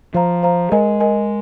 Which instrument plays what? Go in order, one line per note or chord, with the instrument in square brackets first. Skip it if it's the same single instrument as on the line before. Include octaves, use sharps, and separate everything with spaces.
[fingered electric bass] F3 [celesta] C5 F5 A#5
[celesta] C5 F5 A#5
[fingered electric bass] G#3 [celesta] A#4 D#5 G#5
[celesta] A#4 D#5 G#5